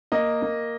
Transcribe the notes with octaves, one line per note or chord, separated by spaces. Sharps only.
A#3 D#5
A#3